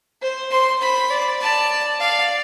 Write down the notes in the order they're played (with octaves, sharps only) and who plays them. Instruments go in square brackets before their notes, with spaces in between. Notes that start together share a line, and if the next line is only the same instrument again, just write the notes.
[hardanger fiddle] C5
[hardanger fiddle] C5 [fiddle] C6
[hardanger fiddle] C5 [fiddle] B5
[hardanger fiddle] D5
[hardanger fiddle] D5 [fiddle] A5
[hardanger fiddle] D5 [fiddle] F5